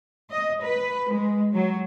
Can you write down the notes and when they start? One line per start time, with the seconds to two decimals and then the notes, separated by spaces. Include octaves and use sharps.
0.30 D#5
0.62 B4
1.11 G#3
1.53 F#3